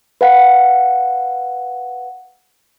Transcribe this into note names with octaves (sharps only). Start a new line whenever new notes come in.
B4 F5 F#5